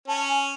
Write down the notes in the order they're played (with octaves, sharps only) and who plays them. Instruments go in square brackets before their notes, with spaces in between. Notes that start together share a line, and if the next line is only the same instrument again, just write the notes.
[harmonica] C#4 [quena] A5
[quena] G#5